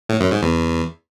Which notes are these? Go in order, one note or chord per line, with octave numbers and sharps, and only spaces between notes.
A2
F#2
G#2
E2